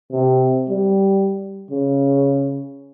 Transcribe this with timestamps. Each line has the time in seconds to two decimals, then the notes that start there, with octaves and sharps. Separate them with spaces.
0.12 C3
0.69 G3
1.71 C#3